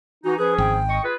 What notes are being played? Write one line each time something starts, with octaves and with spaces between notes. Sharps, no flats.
E3 D#4 F#4
F3 C#4 G#4 B4
G#1 G5
D#5 C#6
F4 G#4 B4